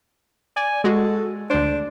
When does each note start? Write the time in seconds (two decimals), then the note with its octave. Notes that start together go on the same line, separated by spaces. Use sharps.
0.56 D5 G#5
0.84 G#3 F#4 A4
1.50 D2 D4 C5